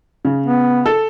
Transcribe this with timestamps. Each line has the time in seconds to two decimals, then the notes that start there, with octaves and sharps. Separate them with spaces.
0.25 C#3
0.46 B3
0.86 A4